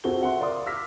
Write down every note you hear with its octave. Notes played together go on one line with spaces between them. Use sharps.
C4 F4 F#4 G#4 A4 G7
E5 F#5 C6
A#4 D5 F5 C6 D#6
D6 E6 F6 A#6 B6